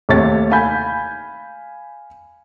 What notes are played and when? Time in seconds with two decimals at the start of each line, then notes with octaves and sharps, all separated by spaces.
0.09 D#2 C3 A3 C#5 A6
0.51 F5 G#5 B5 G6